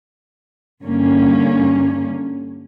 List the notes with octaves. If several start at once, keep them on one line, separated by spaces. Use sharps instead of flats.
G2 D3 A#3 C#4